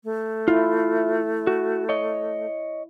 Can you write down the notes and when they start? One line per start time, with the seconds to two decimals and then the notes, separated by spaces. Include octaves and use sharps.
0.04 A3
0.48 E4 F4
1.47 F#4
1.89 C#5 D#5